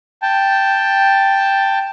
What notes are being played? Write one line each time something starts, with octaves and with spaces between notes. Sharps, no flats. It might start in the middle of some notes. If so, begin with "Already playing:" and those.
G5 A5